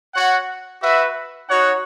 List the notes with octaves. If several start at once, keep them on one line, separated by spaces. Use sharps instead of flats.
F#4 C#5 F#5
F#4 B4 E5
D#4 F#4 C#5 F#5